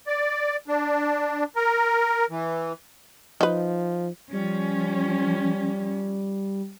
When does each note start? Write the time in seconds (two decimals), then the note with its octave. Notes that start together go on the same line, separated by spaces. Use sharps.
0.07 D5
0.68 D4
1.56 A#4
2.30 E3
3.41 F3 D#4 B4
4.33 F3 G3 C#4